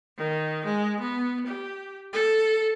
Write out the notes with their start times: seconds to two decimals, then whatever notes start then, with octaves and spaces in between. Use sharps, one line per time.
0.17 D#3
0.65 G#3
0.99 B3
1.46 G4
2.13 A4